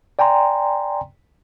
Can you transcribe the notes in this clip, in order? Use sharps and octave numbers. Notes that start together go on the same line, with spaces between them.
D5 G5 G#5 A#5 C6